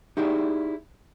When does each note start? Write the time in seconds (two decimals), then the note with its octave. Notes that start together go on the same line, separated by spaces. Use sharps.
0.17 D#4 E4 G4 G#4 D5